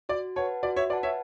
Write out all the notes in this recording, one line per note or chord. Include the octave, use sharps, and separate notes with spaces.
F#4 D5
B4 C#5 F#5 A5
F#4 D5
C#5 E5
B4 D5 F#5 A5
C#5 E5